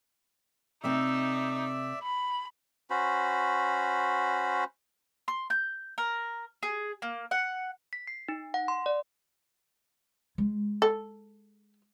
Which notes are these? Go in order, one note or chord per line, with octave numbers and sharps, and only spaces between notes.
C3 A3 C4 D#4 D5 E5 E6
B5
C#4 F#4 C5 B5
C6
G6
A#4
G#4
A#3
F#5
B6
C7
D#4
F#5
C6
D5
G#3
A4